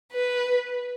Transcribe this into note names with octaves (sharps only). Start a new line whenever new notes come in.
B4